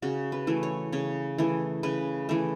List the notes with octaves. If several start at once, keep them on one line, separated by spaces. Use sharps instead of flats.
C#3 F#4
B4
E3 A3
C#5
C#3 C#5
E3 A3
C#3 B4
E3 A3